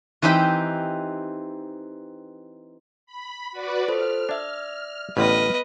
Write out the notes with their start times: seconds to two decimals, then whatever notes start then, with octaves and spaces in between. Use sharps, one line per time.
0.22 E3 C4 D#4 G4 G5 B5
3.06 B5
3.52 F#4 B4 D5
3.88 F4 A4 C5 F6
4.29 D4 D5 E5
5.17 A1 A2 D3 B3 B4 D#5 F6